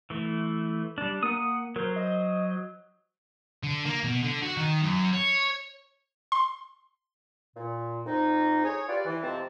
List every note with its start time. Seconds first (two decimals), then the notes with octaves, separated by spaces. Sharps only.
0.10 E3 A3
0.98 G3 D4
1.23 A#3 F#5 D#6
1.76 F#3 A#4 C5
1.96 D#5
3.63 D3
3.85 A#3
4.04 B2
4.23 D3
4.42 F#4
4.57 D#3
4.81 F#2
5.13 C#5
6.32 C6
7.57 A#2
8.06 F2 D#4
8.65 G#4 C#5
8.89 F4 G4 B4 D5
9.06 E3
9.23 F2 C3 F3 G#3 C4 A5